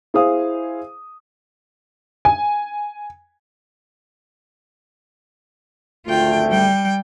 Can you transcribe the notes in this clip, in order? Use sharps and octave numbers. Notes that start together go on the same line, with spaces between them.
E4 G#4 C5 F5 D#6
G#5
G#1 D2 A3 F4 G5
G3 G5